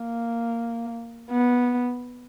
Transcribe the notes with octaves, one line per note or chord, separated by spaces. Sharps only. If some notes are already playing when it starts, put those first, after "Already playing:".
Already playing: A#3
B3